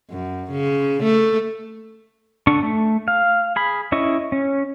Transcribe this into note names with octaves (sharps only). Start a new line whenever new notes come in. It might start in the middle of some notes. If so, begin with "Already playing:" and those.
F#2
C#3
A3
D3 D4 C#6
A3
F5
G#4 B5
C#4 E4 D#5 C#6
C#4